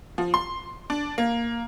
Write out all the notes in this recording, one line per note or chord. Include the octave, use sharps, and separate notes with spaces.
F3
C6
D4
A#3